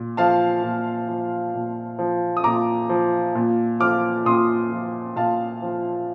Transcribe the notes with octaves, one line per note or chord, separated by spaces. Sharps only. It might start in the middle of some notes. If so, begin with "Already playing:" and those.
Already playing: A#2
F3 F5 A5
A#2
F3
A#2
F3
D#6
A#2 A#5 D6
F3
A#2
F3 D6 F6
A#2 C6 D#6
F3
A#2 F5 A5
F3